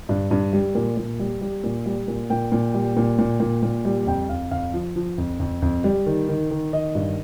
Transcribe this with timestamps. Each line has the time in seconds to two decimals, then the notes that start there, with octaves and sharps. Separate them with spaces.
0.09 G2
0.31 G2
0.53 G3
0.75 A#2
0.97 A#2
1.20 G3
1.41 G3
1.64 A#2
1.86 G3
2.08 A#2
2.30 A#2 G5
2.52 A#2
2.74 G3
2.97 A#2
3.19 A#2
3.40 A#2
3.63 A#2
3.85 G3
4.07 F2 G5
4.29 F2 F5
4.51 F2 F5
4.74 F3
4.96 F3
5.18 F2
5.40 F2
5.62 F2
5.84 G3
6.06 D#3
6.29 D#3
6.51 D#3
6.73 D#3 D#5
6.95 G2